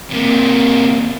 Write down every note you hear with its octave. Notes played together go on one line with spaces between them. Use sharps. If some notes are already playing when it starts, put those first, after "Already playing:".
C3 A#3